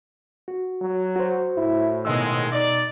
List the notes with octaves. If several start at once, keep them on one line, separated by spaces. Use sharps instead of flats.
F#4
F#3
F#4 C5
A2 E4
G#2 B2 D#3 F3 G#3 D#5 E6
D#4 D5